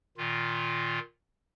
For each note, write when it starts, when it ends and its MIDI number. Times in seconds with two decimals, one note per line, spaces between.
0.17 0.99 46
0.17 0.99 51
0.17 0.99 65